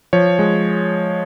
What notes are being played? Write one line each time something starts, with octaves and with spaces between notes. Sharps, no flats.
F3 C#5
G#3